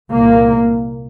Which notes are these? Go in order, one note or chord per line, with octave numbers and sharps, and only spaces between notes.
C2 A#2 A#3